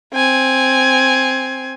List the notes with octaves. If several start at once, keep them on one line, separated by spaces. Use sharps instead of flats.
C4 G#5